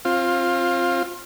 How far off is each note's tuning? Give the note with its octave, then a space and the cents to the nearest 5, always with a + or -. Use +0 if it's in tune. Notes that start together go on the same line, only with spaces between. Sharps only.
C4 +25 F4 +0